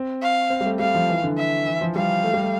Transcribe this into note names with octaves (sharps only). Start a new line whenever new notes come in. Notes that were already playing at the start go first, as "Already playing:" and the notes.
Already playing: C4
F5
C4
G3
A3
G3 F5
F3
E3
D3
E5
E3
F3
G3 F5
A3
G3
A3